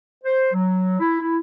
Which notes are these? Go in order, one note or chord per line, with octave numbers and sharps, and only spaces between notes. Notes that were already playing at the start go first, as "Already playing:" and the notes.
C5
F#3
E4
E4